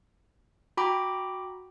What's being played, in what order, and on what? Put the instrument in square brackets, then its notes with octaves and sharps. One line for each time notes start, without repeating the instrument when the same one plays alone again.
[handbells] F#4 G5 A#5 B5 D6